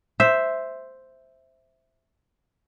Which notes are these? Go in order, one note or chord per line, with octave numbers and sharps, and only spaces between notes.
C5 E5